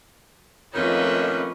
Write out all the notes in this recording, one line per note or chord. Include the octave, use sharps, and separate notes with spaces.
F2 D#3 A3 A#3 C#4 F4 B4 D#5